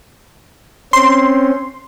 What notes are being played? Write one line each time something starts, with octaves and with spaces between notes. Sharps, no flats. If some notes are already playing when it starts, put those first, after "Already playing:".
C4 C#4 C6